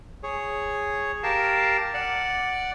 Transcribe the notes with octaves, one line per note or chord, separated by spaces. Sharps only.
G#4 C#5
G4 A#4 F5 A5
D5 F#5